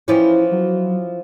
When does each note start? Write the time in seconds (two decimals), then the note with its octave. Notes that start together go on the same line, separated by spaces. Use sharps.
0.08 E3 F3 C#4 E4
0.52 F#3